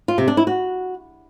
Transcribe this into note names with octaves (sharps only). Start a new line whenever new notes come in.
F4
C3
D4
E4
F#4